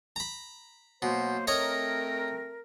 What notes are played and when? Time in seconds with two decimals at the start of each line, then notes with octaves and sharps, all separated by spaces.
0.16 A#5 B5
1.02 B2 F#3 A#3 C5
1.47 A3 C4 A#4 C#5 D#5 A#5